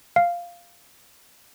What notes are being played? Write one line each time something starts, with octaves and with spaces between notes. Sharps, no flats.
F5